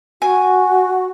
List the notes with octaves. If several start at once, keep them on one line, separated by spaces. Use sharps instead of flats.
F#4 G#5